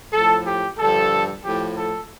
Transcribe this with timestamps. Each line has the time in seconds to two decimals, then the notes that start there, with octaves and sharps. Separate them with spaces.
0.13 A2 F3 A4
0.46 G4
0.78 G2 D3 F3 A4
1.43 A2 F3 G4
1.77 A4